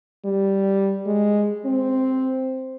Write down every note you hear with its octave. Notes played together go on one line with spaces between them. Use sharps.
G3
G#3
C4